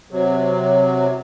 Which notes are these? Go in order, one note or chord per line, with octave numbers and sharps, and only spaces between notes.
C3 F#3